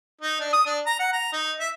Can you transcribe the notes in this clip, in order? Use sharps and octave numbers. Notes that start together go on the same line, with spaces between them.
D#4
D4
D#6
D4
A#5
F#5
A#5
D#4
E5